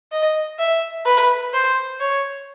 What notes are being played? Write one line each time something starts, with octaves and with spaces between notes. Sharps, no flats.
D#5
E5
B4
C5
C#5